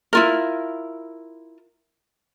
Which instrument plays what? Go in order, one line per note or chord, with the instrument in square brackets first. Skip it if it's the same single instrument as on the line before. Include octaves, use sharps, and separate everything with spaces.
[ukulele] E4 F4 A#4